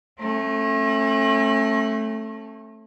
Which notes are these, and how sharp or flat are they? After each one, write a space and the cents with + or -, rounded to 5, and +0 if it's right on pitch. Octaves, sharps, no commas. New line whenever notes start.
A3 +5 C#4 -40